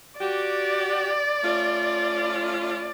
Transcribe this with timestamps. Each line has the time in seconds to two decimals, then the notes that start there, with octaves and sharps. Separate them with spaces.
0.20 F#4 G4 D5
1.43 A3 C#4 F4